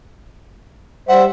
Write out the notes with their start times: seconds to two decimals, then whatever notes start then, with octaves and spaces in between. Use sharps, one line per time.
1.09 G3 C5 E5 F#5